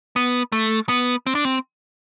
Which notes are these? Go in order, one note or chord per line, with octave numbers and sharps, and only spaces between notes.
B3
A3
B3
C4
D4
C4